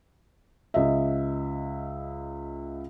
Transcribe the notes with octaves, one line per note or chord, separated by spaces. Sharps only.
C#2 D#5 E5